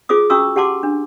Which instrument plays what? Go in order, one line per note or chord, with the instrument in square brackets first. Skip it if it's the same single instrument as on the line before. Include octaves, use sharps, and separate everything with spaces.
[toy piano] F4 G#4 C5 D6 D#6
C#4 F#4 A#5 C#6 D#6 E6
G4 F#5 A5 C6 D6
D4